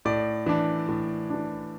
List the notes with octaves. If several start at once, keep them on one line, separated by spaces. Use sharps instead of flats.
A2 D5
E3 D4
A2
E3 D4